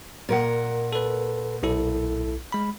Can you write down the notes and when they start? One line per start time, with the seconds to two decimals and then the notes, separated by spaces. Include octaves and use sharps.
0.29 A#2 A#4 F#5
0.93 A4 B4
1.63 B1 E4 A4
2.52 G#3 B5